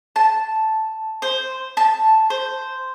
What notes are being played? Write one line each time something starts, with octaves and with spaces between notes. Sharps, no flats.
A5
C5
A5
C5